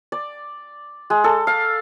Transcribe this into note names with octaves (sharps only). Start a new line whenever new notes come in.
D5
G#3
A4
F5